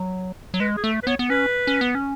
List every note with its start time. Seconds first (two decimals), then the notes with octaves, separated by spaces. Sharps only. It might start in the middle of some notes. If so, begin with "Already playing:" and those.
Already playing: F#3
0.54 F#3
0.60 G#3 B4
0.77 G#4
0.83 A3 A4
1.03 B4
1.07 B3 C#5
1.19 B3
1.30 C#4 B4
1.67 C#4
1.81 B3
1.95 C#4